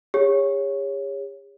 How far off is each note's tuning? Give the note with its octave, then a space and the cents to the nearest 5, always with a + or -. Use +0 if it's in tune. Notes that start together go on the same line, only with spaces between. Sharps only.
G#4 -45 C#5 +0